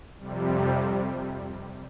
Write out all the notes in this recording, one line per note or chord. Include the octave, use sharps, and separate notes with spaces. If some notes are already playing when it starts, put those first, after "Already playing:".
F2 C3 G3